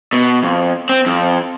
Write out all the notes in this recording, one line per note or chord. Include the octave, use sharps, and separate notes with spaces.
B2
F2
C4
F2